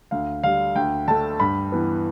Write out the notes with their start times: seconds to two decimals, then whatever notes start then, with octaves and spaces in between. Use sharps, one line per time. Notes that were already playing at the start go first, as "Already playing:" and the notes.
0.11 D2 F5
0.43 D3 G3 F5
0.76 D2 G5
1.08 D3 A3 A5
1.40 G2 B5
1.72 E3 B3